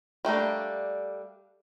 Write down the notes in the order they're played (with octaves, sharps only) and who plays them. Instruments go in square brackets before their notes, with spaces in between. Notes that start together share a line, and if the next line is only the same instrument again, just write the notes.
[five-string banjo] G3 A3 A#3 D4